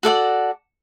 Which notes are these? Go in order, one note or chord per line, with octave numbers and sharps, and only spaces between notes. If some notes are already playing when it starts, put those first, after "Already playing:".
F#4 A4 D5 F#5